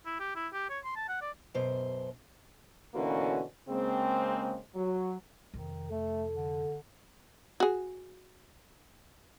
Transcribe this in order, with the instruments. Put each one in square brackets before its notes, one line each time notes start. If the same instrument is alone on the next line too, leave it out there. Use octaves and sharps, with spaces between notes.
[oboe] E4
G4
E4
G4
C#5
C6
A5
F#5
D5
[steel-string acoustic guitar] F#2 B2 C5
[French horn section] B2 D3 E3 A#3 C#4 F#4
C#3 G#3 A#3 C4
F#3
[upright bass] F2 C3 [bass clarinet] D#3
[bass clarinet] A3 [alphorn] A4
[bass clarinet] D3
[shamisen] F#4 G#4